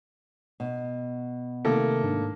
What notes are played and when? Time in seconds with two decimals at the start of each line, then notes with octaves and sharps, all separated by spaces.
0.60 B2
1.65 C3 D#3 A3 A#3 A4
2.03 G#2 D4